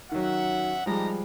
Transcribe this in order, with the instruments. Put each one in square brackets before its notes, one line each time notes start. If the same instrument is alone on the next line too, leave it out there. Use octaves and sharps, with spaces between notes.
[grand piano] D#3 F#3 [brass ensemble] C#4 E5 F#5
[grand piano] F3 G3 G#3 [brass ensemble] D#4 G4 A#5